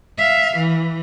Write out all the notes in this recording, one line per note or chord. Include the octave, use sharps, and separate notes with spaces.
E5 F5
E3